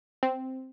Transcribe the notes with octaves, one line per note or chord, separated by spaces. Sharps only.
C4